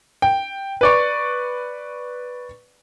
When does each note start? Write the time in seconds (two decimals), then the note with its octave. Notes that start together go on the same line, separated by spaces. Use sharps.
0.22 G5
0.81 B4 D5 C#6